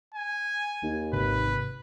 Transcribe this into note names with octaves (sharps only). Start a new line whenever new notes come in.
G#5
D#2
G#1 C3 B4